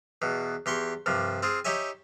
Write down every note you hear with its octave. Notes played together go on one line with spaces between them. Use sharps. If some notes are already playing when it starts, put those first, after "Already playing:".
E2 B2
E2 G4 C6 C#6
C2 G2 F3
C4 F4 G#4
D#4 G4 C#5 E5 G#5